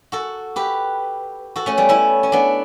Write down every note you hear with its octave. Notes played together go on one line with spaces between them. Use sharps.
F#4 A4
G4 B4
F#4 A4
A3 C#4
G3 B3
C#4 E4
C#4
B3 D4